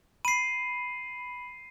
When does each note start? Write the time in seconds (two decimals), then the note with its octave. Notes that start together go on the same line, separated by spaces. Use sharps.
0.25 B5 C7 D#7